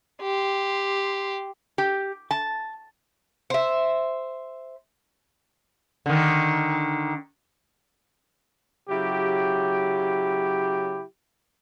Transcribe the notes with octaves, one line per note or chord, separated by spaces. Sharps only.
G4 C6
G4
A5
C5 E5
D3 D#3
C#3 F#3 E4 G4